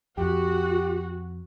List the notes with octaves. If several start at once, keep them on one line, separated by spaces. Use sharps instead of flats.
F2 F#4 G4